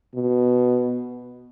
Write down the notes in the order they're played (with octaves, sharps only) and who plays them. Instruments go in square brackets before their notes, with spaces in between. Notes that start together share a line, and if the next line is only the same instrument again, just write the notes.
[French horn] B2